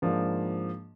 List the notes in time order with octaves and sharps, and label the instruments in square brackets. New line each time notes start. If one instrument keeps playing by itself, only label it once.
[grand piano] G#2 F3 A#3 D4